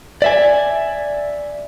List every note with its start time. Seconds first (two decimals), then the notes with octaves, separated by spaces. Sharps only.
0.22 D5 E5 G#5